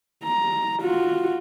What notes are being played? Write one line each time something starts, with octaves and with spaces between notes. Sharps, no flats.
A#5
F4 F#4